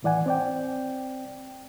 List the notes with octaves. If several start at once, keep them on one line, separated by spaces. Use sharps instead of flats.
D#2 A2 E3 D5 F#5 G#5
C4 D5 G5